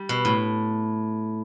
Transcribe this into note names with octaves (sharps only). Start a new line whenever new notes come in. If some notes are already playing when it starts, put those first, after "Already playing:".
Already playing: G3
B2
A2